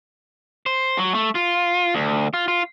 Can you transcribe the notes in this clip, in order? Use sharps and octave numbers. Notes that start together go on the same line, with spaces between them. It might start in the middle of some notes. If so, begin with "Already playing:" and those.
C5
F#3
A3
F4
D2
F4
F4